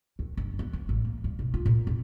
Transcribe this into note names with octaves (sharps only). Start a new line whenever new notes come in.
D#2
G1
B3
E3
A1
A#3
G2
B1
F4
A#2
F2